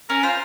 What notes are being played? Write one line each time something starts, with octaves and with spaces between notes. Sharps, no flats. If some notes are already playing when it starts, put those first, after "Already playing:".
C#4 A#4
F4 C5